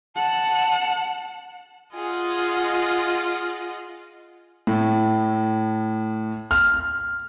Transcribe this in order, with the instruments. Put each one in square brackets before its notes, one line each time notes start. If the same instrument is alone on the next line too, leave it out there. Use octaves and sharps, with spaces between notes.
[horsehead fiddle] F#5 [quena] A5
[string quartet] F4 D#5 F#5 [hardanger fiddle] G#4
[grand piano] A2
F6